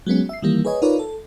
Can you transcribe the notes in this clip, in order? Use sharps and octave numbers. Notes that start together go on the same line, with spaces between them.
F#3 G#3 B3 C#4
E5 C7
D#3 E3 G3 A#3
G#4 B4 C#5 D#5 G#5
D#4 F4 A#4 B4 C#5 D5
A4